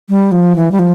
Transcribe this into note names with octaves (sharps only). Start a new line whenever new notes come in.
G3
F3
E3
G3
F3